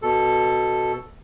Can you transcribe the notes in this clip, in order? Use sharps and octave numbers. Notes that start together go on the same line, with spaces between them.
B2 A4